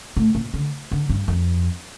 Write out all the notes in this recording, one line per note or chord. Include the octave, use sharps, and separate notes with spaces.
A2
A#2
D3
D3
G2
F2